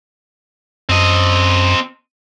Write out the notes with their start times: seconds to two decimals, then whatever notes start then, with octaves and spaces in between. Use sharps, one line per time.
0.89 F#2 C4 D#5